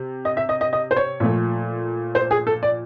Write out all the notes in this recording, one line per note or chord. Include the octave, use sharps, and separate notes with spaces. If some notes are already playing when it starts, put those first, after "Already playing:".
Already playing: C3
D#5
E5
D#5
D#5
D#5
C5
C#5
A#2 F3 A3
C5
G#4
A4
D5